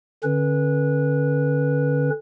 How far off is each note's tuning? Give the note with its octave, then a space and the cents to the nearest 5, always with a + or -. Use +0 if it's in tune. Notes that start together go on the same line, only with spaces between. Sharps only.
D3 -5 C#4 -20 B4 -20